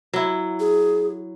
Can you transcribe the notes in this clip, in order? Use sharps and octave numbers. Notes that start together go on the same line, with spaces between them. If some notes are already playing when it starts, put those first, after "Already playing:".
F#3 E4
G#4